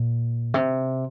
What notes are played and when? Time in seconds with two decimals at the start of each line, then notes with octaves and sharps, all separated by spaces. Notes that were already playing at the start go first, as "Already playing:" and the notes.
Already playing: A#2
0.54 C3